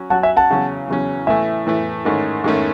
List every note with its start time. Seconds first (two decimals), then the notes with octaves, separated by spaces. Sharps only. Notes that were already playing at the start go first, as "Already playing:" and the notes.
Already playing: F#3 C#4 F#4
0.10 F#3 C#4 F#4 C#5 F#5 A5
0.23 E5 G#5
0.37 F#5 A5
0.50 E2 C#3 F#3 C#4
0.88 E2 C#3 F#3 C#4
1.27 A2 E3 A3 E5 G#5
1.67 A2 E3 A3
2.05 G#2 D#3 A3 C#4
2.44 G#2 D#3 A3 C#4